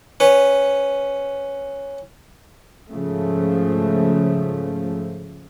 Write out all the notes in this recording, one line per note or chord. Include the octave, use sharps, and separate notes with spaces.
C#4 B4 C#5
G#2 C#3 F3 A3